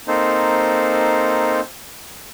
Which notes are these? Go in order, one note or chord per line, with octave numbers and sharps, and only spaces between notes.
A#3 C4 D#4 A4 C5